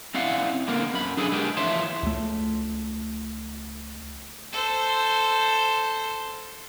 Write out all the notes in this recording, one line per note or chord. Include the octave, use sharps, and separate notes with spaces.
C4 C#4 E4 D5 F5 F#5
D3 A#3 B3 A#4
F#2 B5
D4 G#4 A4 G5 G#5
G#3 B3 D4 G4 A#4 G5
E3 F3 C#5 E5 A5 C6
C#2 A3
A4 C5